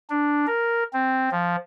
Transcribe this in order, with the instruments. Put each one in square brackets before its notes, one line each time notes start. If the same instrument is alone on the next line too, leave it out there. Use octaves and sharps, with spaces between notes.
[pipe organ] D4
A#4
C4
F3